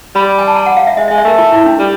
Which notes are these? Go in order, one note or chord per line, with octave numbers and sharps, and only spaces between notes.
G3 B5
G#5
A5
A#5
F#5
F5
E5
G#3 D#5
G#3 D#5
E5
A3 A#4
F4
E4
D4
G3